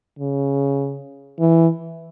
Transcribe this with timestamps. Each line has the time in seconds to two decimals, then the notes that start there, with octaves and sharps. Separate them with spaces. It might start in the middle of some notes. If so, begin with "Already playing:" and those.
0.19 C#3
1.39 E3